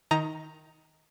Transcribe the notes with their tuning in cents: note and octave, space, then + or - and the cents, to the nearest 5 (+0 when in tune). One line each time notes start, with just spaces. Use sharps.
D#3 +0 D#4 +20 A#5 +0